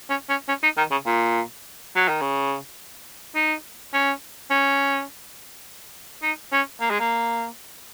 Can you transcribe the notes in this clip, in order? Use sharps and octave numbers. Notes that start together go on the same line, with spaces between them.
C#4
C#4
C#4
D#4
D#3
C#3
A#2
F#3
D#3
C#3
D#4
C#4
C#4
D#4
C#4
A#3
G#3
A#3